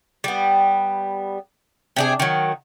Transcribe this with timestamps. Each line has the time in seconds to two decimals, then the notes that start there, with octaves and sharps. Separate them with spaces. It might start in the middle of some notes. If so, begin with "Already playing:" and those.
0.24 G3 B3
1.96 C3 D4 G#4
2.20 D#3 F#3